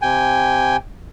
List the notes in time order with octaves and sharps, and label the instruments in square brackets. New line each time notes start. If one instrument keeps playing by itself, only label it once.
[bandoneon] C3 G5 G#5